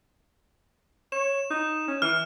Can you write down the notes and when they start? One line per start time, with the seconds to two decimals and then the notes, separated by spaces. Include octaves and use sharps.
1.12 C#5 E7
1.51 D#4
1.88 C#4
2.02 E3 F6